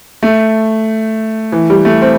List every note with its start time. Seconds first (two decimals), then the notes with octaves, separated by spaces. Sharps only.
0.23 A3
1.52 E3
1.70 G3
1.85 A3
2.01 C4